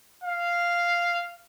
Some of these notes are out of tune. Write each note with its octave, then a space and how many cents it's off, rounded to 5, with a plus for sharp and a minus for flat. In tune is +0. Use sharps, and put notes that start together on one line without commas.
F5 -5